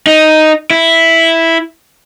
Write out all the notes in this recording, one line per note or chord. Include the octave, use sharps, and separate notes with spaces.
D#4
E4